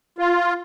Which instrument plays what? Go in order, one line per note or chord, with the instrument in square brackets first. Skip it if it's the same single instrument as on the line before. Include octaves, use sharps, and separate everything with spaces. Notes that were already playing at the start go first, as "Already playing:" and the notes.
[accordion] F4